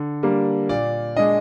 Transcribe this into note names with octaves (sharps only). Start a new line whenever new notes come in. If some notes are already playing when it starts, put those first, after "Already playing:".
Already playing: D3
G3 A#3 D4
A#2 D5
G#3 D4 D#5